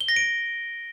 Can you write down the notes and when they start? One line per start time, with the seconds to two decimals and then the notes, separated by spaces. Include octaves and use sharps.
0.01 G7
0.08 A#6
0.16 D7